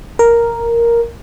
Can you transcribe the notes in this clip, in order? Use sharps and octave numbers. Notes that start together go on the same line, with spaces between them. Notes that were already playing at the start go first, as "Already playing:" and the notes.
A#4